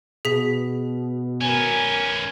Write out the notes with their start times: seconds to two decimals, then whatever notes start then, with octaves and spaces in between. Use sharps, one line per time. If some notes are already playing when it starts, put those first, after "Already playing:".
0.25 B2 G#4 B6
1.41 C#4 A#4 B4 G#5